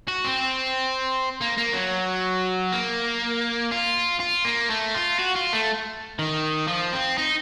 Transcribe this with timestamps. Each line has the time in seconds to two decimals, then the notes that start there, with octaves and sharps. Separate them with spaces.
0.08 F#4
0.24 C4
1.41 A#3
1.57 A#3
1.73 F#3
2.73 A#3
3.72 F4
4.20 F4
4.45 A#3
4.70 A3
4.95 F4
5.19 F#4
5.36 F4
5.53 A3
6.19 D#3
6.68 F3
6.93 C4
7.18 D#4